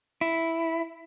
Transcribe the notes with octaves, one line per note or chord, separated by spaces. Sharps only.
E4